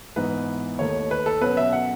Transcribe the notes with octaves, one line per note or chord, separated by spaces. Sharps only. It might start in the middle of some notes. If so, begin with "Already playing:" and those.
G#2 E3 B3 D#4 B4
D#2 D#3 A3 D#4 C#5
B4
A4
B2 F#3 C#4 B4
E5
F#5